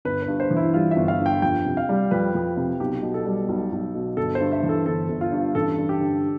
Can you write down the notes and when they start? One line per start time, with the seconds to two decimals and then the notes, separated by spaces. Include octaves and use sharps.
0.05 G1 B4
0.22 B4
0.28 G2
0.40 C5
0.51 E3
0.57 E4
0.74 G3 F4
0.91 E5
0.97 G1
1.08 F5
1.20 G2
1.26 G5
1.42 F2 G5
1.65 C3
1.77 F5
1.89 G3
2.11 F2 B4
2.35 F2
2.57 C3
2.80 B1 G4
3.02 B2
3.14 A4
3.25 G3
3.49 B1
3.72 B1
3.94 B2
4.17 G1 A4
4.35 C5
4.40 G2
4.52 E5
4.63 E3
4.69 A4
4.86 G1 A4
5.09 G1
5.21 F4
5.32 G2
5.55 A1 A4
5.78 G2
5.89 G4
6.00 D3